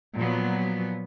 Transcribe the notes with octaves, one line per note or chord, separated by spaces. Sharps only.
A#2 F3 F#3 B3